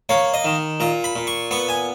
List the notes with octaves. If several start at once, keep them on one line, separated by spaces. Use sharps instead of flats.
A#3 C#5
D#5
D#3
A#2 A#5
B5
A#2
C#6
B3 C#6
G#5